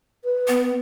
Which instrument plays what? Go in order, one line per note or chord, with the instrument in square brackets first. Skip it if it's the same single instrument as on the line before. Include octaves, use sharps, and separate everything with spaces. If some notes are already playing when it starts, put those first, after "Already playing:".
[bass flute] B4
[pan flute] B3